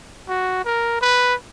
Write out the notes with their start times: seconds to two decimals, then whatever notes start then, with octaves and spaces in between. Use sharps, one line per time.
0.29 F#4
0.65 A#4
1.01 B4